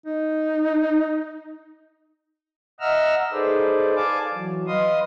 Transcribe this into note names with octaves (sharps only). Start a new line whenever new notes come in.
D#4
D#5 E5 F#5 A#5 E6 F6
D#4 G#4 A4 B4 C5 D5
D5 F5 G#5 A5 D6
E3 F#3
B4 D#5 F5 C6 D#6